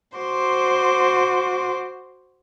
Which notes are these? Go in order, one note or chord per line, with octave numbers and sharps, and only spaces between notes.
F#4 C5 C6 D6